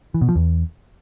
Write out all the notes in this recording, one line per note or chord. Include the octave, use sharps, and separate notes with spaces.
E3
B2
F3
E2